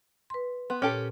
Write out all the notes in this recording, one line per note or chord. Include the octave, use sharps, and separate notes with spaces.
B4 C6
B3 C6
A#2 C#4 G4 A4